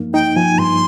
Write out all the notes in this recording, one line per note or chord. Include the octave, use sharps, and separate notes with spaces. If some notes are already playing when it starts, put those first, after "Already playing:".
Already playing: G2 F3 A#3 D#4
D#4 G5
F3 G#5
G2 C6